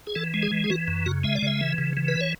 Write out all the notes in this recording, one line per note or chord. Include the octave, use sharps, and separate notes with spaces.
G#4
E3 A4
G#3
G#4
E3
G#4
E3 F#4
F#2
C#3 F#4
G#3 E5
D5
C#3 E5
E3
C#3
E3
B4
C#5